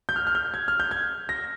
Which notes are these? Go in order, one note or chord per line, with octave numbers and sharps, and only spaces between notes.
G6
F6
F6
G6
G#6
F6
G6
G#6
A#6